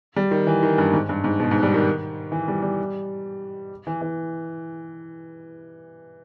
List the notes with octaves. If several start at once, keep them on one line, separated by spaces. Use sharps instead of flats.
G3
D#3
E3
D#3
G2
G#2
G2
G#2
B2
G#2
G3
D#3
E3
G3
G3
E3
E3